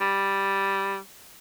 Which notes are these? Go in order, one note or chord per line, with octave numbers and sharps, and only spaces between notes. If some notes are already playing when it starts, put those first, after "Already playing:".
G3